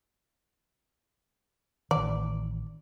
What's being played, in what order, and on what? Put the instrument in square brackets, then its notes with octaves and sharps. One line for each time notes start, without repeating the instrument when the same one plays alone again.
[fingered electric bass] A1 D#3 [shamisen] D5